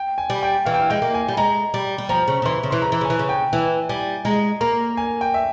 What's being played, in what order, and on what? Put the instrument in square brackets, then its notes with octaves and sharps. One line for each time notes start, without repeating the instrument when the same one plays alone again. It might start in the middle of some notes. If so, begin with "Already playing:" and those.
Already playing: [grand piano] G5
G#5
[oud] G3
[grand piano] G5
[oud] E3 [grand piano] F5
[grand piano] G5
F5
[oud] G#3 [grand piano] G5
[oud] A#3
[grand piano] G#5
[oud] G3
[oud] G#3 [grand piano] A#5
[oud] G3
G3
[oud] F3 [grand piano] A#5
[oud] C#3
C#3
[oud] E3 [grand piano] C6
[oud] C#3
[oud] E3 [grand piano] C6
[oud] C#3 [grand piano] A#5
[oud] E3
[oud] C#3 [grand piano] G#5
[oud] E3
C#3
[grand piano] G5
[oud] E3 [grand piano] G#5
[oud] G3 [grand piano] G#5
[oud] G#3 [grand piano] A#5
[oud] A#3 [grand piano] A#5
[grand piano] G#5
G5
E5